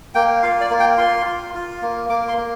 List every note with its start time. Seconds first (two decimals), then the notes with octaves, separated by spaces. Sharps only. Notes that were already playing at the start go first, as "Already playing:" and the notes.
0.15 A#3 G5
0.43 F4 F5
0.61 D5
0.70 A#3
0.80 G5
0.98 F4 C6
1.26 F4
1.54 F4
1.82 A#3
2.10 A#3 D6
2.28 C6
2.37 A#3